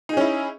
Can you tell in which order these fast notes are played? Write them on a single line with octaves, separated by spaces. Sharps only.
D#4 G#4 C#4 E4